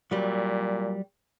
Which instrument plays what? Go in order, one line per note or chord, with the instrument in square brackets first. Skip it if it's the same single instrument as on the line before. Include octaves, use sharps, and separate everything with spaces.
[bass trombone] A#2 [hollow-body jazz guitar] F#3 G3